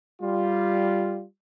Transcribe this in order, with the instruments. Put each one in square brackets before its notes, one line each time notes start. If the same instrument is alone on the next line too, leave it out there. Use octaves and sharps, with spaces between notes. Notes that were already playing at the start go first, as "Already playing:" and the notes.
[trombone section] G3 F4